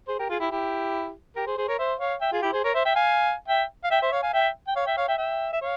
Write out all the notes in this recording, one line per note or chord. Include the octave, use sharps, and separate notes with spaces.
G#4 C5
G4 A#4
F4 G#4
E4 G4
E4 G4
G4 A#4
G#4 C5
G#4 C5
A#4 C#5
C5 E5
C#5 F5
E5 G5
F4 G#4
E4 G4
G#4 C5
A#4 C#5
C5 E5
E5 G5
F5 G#5
E5 G5
F5
E5 G5
C5 E5
C#5 F5
F5 G#5
E5 G5
G5
C#5 F5
E5 G5
C#5 F5
E5 G5
E5 G5
E5
C#5 F5